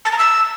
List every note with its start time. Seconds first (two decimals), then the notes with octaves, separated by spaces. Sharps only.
0.05 A5
0.12 A#5
0.19 E6